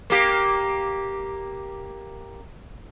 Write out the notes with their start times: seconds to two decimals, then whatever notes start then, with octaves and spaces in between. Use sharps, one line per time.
0.10 A#3 G4